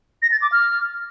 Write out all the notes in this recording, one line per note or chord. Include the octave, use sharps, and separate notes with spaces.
A#6
A6
D6
F6